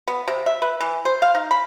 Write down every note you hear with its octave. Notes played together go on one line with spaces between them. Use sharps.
B3
C3
E5
B4
E3
C5
F5
D#4
B5